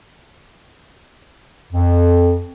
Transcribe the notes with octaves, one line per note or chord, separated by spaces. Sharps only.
F2